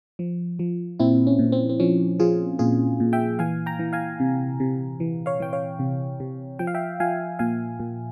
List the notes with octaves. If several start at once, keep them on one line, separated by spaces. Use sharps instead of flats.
F3
F3
A#2 C4 E4
C#4
A#2
C4
C4
F3 C#4
F3 F4 G#4
A#2 F4 G#4
A#2
E5 G5
E3 F5 G#5
G5 A#5
E3
F5 G#5
C3
C3
E3
C#5 F5
E3 G5
C#5 F5
C3
C3
F3 G5
F5
E5 G5
F3 F5 G#5
A#2 F5 G#5
A#2